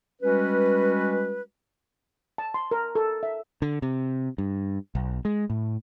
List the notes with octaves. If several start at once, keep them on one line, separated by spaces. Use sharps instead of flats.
G3 G#3 C#4 F#4 B4
A5
C6
A#4
A4
E5
D3
C3
G2
B1
G#3
A2